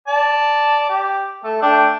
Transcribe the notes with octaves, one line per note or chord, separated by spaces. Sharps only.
D5 A5
G4
A3 A4
A3 D4 G5